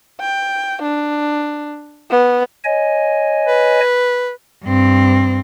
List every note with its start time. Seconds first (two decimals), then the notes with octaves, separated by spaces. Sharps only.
0.20 G5
0.82 D4
2.11 B3
2.64 C#5 D#5 G#5
3.47 B4
4.64 G2 C4